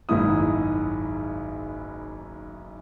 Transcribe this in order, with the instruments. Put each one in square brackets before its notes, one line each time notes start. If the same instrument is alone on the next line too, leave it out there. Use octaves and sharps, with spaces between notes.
[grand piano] F#1 B1 G#2 D#3 E4 D#6